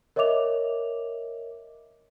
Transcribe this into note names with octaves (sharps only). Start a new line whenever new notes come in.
A#4 C#5 D#5 E5 D6 F7